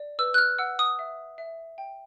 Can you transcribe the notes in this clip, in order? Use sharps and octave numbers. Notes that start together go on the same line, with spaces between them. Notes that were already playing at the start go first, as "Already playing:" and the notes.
Already playing: D5
B4 E6
F#6
F6
F#5 E6
D#6
E5
E5
G5